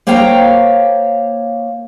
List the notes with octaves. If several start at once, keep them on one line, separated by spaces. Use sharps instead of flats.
A#3 C5 C#5 F5 G5 A#5